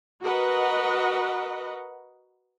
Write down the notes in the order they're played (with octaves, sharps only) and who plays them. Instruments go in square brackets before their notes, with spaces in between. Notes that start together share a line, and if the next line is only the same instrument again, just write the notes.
[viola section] F#4 A#4 B4 D#5 F#5